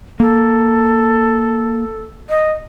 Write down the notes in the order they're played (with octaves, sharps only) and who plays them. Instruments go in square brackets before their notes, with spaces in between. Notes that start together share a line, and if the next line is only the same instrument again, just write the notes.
[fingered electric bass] A#3 [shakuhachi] A4
[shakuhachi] D#5